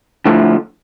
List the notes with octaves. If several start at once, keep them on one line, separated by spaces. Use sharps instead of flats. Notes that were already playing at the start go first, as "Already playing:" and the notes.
D3 F3 A3 E4